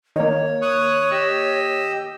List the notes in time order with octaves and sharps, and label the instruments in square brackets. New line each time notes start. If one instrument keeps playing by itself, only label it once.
[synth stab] D#3 A#3 [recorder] C#5
[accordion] C#6 D#6 F#6
G4 D#5 E6